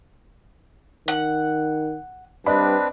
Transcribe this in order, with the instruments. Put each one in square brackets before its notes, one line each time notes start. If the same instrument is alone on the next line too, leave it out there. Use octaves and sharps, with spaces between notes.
[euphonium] D#3 [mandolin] F#5
[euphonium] G2 [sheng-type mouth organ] C4 D4 B4 [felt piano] D5 D#5 B5